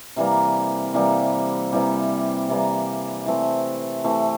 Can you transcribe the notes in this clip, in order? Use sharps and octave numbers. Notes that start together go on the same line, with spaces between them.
C3 E3 G3 A#3
C3 E3 G3 A#3
C3 E3 G3 A#3
C3 E3 G3 A#3
E3 A3 C4 G4
E3 A3 C4 G4